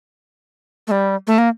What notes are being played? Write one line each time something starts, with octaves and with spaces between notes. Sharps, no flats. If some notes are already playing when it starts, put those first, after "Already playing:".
A3
G3
A3
A#3